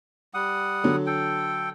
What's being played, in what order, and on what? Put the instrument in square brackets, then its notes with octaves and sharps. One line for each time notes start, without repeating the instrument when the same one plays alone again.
[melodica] G3 F#5 D#6
[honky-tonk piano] D3 F#3
[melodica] A4 G5